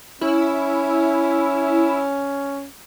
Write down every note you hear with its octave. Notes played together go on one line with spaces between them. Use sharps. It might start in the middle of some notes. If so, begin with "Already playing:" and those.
C#4 E4